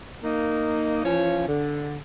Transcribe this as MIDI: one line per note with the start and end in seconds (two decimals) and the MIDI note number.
0.24 1.04 58
0.24 1.04 63
1.04 1.47 52
1.04 1.47 53
1.04 1.47 61
1.04 1.47 65
1.04 1.47 73
1.48 1.96 50